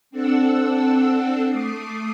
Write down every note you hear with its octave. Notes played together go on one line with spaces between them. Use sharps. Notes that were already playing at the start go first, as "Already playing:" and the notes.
C4 D4 A4 F#5 E6
A3 D6 D#6 C7